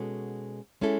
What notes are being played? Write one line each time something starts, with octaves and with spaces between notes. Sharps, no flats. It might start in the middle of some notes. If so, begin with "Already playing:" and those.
Already playing: B2 G#3 C#4 F#4 A4
G#3 C#4 E4 A4